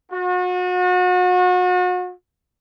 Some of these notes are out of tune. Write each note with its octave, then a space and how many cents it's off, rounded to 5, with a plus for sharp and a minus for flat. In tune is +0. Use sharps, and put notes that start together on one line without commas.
F#4 -35